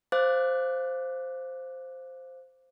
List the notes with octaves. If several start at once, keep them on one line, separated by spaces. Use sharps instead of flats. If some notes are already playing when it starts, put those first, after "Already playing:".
C5 F5 D6 F#6 A6